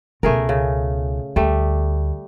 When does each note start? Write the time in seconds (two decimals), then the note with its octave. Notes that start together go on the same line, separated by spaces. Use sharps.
0.23 C#2 B2 A3 G#4 A#4
0.49 C#3
1.36 D2 G3 A3